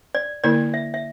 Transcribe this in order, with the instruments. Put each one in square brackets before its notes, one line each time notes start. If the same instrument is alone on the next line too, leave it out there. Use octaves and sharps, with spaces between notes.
[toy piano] D5
[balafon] D3 A#3 E4 A#4 [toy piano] D5
[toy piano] E5
E5